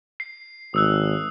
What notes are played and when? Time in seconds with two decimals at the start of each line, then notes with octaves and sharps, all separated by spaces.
0.20 C7
0.74 G#1 D#6 E6 F#6